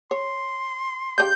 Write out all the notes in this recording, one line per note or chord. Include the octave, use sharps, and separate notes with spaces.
C#5 C6
C#3 D4 G4 G6